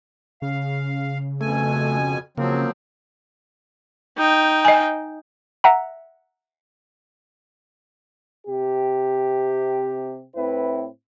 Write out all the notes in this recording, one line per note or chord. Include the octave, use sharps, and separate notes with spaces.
C#3 F5
F2 B2 A3 G#5
C#3 F3 F#3 A#3 C4
D#4 G5
D#5 G#5
E5 F#5 A#5
C3 G4
A2 C4 E4 B4